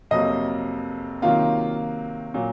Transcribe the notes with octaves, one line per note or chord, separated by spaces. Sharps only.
F2 C3 F#3 A#3 D#5
C3 D#3 F#3 A#3 F4
A#2 F#3 A#3